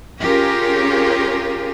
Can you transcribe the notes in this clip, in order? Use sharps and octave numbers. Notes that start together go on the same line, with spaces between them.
C#4 F4 G4 G#4 A#4